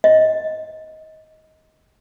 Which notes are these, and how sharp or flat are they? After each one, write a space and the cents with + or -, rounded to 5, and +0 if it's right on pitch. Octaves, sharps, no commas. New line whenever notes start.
D#5 +15